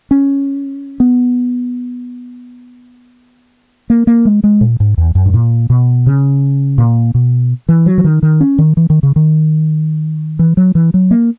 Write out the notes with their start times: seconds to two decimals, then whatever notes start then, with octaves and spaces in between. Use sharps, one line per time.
0.11 C#4
1.00 B3
3.90 A#3
4.07 A#3
4.25 G#3
4.44 G#3
4.61 A#2
4.80 G#2
4.98 E2
5.15 F#2
5.26 G#2
5.34 A#2
5.70 B2
6.06 C#3
6.78 A#2
7.15 B2
7.69 E3
7.86 F#3
7.98 E3
8.04 D#3
8.23 D#3
8.41 C#4
8.58 D#3
8.77 E3
8.90 D#3
9.03 C#3
9.16 D#3
10.39 E3
10.57 F#3
10.75 E3
10.94 F#3
11.11 A#3